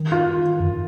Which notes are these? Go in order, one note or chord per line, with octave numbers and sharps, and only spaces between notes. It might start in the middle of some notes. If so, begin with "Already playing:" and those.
Already playing: D#3
F4
F#2